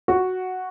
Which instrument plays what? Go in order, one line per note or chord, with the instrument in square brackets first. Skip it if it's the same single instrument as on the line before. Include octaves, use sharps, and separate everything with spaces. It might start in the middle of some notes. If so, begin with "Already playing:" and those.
[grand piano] F#4